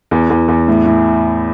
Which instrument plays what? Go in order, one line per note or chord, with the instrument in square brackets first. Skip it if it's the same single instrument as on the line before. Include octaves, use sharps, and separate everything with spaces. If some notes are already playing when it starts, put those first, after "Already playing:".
[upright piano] E2
E2
E2
A2
A2